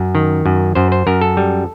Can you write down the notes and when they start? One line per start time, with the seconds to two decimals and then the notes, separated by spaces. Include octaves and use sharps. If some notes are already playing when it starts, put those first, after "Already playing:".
Already playing: F#2
0.15 D#3
0.46 F#2
0.75 F#2 C5
0.92 C5
1.07 F#2 A#4
1.22 A4
1.37 G3